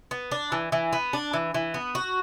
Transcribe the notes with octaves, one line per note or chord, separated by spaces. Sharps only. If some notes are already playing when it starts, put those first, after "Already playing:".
B3
D4
E3
E3
B3
D4
E3
E3
B3
F#4